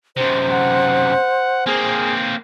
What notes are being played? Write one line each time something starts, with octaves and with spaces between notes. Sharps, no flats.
F#2 C3 C5
F#5
A#3 C4 G#4